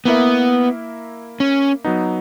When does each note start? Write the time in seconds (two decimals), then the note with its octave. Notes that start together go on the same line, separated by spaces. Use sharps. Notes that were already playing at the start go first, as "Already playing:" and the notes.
0.05 A#3 B3 E4 A#4 E5
1.40 C#4
1.85 F#3 B3 D#4